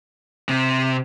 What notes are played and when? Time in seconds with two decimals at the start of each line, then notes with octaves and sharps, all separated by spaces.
0.49 C3